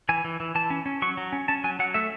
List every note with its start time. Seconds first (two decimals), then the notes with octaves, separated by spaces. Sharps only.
0.09 E3 G#5
0.24 E3
0.40 E3
0.55 E3 A5
0.70 C#4
0.86 C#4
1.02 F#3 C#6
1.17 F#3
1.33 C#4
1.48 C#4 A5
1.64 F#3 G#5
1.79 F#3 F#5
1.94 A3 E5